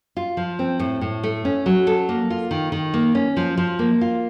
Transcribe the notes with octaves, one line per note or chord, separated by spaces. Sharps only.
F4
F3
C4
A2
A2
A3
C#4
F#3
A4
A#3
F4
D#3
D#3
A#3
C#4
F3
F3
A#3
F4